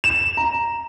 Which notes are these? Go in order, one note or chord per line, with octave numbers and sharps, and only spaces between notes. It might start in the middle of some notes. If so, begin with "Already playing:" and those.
E7
A#5